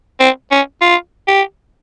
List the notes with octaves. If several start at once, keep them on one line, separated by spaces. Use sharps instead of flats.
C4
C#4
F4
G4